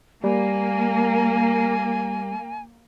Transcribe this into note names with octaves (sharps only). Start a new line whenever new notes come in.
G3 A#3 G#5